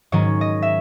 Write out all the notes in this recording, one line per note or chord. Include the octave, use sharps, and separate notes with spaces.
G#2 D#3 F#3 C#4 C#5
D#5
E5